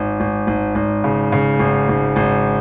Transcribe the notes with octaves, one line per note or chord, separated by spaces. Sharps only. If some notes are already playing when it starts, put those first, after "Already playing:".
Already playing: G#1
G#1
G#1
G#1
C#3
C#3
G#1
G#1
G#1